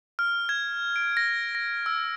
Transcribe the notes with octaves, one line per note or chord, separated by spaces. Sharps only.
F6
G#6
D7
A#6
A#6
E6